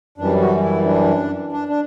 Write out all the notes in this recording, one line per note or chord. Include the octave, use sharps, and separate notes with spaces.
F#2 E3 G3 D4
F#4
E4
D4
D4
D4